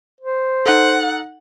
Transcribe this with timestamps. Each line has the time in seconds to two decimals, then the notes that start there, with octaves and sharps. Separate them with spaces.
0.21 C5
0.66 D#4 A4 F#5